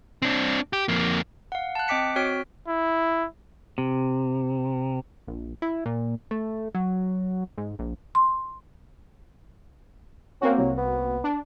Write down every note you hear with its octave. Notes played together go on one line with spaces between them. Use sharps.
C4 D4
G4
F2 A#3
F5 F#5
A5 F#6
C4 D#5 G5 D6 B6 C#7
C4 F#4 C#5 F6 B6 D7
E4
C3
A#1
E4
A#2
A3
F#3
G#2
A#1
C6
A#3 C4 C#4 F#4
C2 F#3
B3
D4